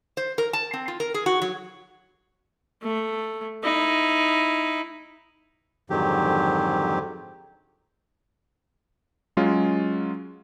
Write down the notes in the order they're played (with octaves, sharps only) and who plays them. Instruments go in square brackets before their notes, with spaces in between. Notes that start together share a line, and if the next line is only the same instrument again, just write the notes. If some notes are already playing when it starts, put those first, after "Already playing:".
[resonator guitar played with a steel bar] C5
A#4
A5
C4
F4
A#4
G#4
F#4
F#3
[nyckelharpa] A3
D#4 E4
[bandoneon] F2 G#2 D3 D#3 F#3 G4
[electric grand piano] F#3 G#3 C#4 F4